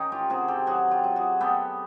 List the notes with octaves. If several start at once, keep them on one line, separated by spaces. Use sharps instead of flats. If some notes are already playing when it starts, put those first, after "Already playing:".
Already playing: D#3 C#4 D#4
F4 G4
C3 F#4 G#4
G4 A4
F#3 F#4 G#4
F4 G4
F#3
F#4 G#4
B3 G4 A4